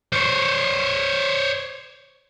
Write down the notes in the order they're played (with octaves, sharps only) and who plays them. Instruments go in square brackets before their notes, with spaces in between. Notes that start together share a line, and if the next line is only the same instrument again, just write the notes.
[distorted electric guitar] C5 C#5